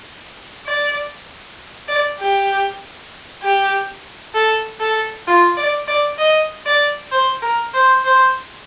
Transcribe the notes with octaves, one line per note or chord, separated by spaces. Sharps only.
D5
D5
G4
G4
A4
A4
F4
D5
D5
D#5
D5
C5
A#4
C5
C5